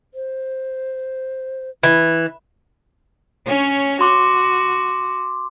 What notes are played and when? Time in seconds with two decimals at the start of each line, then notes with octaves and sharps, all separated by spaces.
0.14 C5
1.83 E3 E4
3.46 C#4 C#5
4.01 F#4 C6 D6